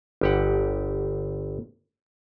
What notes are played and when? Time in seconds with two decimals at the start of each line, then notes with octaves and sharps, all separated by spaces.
0.21 G1 G4 F#5